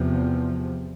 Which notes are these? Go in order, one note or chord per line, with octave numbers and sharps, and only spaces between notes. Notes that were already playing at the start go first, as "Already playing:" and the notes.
Already playing: E2 C3 F3